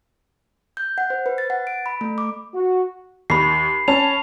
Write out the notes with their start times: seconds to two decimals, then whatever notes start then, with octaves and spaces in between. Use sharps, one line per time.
0.77 G6
0.98 F#5
1.10 C5
1.26 B4
1.38 A6
1.50 F#5
1.67 D7
1.86 B5
2.01 A3
2.18 D6
2.54 F#4
3.30 D#2 B5 C7
3.88 C#4 A5 F7